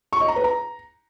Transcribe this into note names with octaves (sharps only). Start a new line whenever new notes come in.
C#6
D#5
A#5
B4
A#5